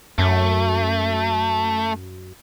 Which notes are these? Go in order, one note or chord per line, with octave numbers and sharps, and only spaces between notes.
F#2 A3